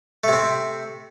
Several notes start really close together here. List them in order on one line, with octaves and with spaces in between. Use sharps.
A3 C3 C4